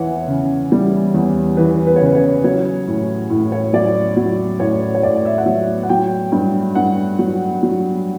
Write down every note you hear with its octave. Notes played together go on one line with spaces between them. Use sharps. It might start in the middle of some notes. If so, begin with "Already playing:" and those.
Already playing: E2 E3 C#5 E5 F#5
C#3
G3
E2
E3 B4
B4
C#5
C#3 B4
C#5
F#3 C#5
A2
A2
C#5
F#3 D5
F#3
A2 C#5
C#5
A2 D5
E5
F#5
F#3 E5
F#5
F#3 G5
G2
G2 F#5
F#3
F#3